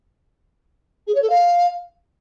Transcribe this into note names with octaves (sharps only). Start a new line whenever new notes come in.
G#4
C#5
A4
F5